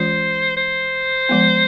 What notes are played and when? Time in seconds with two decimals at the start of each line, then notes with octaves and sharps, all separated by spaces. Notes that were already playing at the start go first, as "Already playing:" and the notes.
Already playing: E3 G#3 C#4 F4 C5
0.56 C5
1.29 F3 G#3 B3